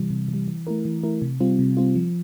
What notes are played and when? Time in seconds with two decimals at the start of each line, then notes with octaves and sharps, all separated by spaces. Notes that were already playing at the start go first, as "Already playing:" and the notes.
Already playing: C3 E3 G3
0.10 C3
0.28 E3 G3
0.48 E3
0.67 A3 E4 A#4
0.85 E3
1.03 A3 E4 A#4
1.22 C3
1.40 G3 C4 F4
1.59 C3
1.77 G3 C4 F4
1.95 F3